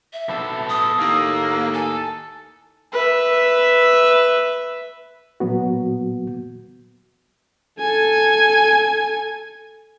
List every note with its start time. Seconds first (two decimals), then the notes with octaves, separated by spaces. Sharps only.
0.13 E5
0.29 B2 A4
0.69 D#6
0.99 D#2 A2 A#3
1.74 A4 G#5
2.93 B4 E5
5.40 A#2 F#3 A#3 B3 F#4
7.80 A4 G#5